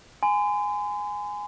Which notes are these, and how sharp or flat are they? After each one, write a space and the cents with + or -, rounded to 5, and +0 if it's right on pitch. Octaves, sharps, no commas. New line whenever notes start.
G#5 +0 C6 -45